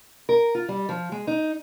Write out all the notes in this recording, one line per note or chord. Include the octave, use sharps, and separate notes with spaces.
A#4
F4
G3
F3
G#3
D#4